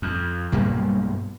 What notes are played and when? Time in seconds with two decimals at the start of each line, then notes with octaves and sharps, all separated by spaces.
0.02 F2
0.52 B1 G2 G3 A#3